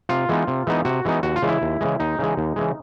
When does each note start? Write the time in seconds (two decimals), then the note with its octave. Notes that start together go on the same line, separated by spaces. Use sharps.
0.09 C3 F4
0.29 E3 G#3 B3 D#4
0.48 C3
0.67 E3 G#3 B3 D#4
0.85 C3 F#4
1.05 E3 G#3 B3 D#4
1.23 D#2 F#4
1.36 F4
1.42 C#3 E3 G#3
1.49 E4
1.62 D#2
1.81 C#3 E3 G#3
2.00 D#2 D#4
2.19 C#3 E3 G#3
2.37 D#2
2.56 C#3 E3 G#3